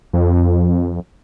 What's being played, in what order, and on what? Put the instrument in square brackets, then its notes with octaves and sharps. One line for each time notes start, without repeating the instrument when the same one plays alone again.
[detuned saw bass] F2